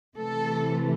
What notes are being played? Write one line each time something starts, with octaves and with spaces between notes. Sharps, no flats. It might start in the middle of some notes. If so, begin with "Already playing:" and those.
C3 E3 A3 A4